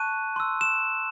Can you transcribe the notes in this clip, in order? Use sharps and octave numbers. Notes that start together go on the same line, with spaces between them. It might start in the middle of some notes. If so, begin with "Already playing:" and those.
Already playing: A5 C#6 F#6 D#7
C6 E6
E7